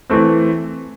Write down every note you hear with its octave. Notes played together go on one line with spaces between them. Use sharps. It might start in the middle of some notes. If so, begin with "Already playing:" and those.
E3 A3 C4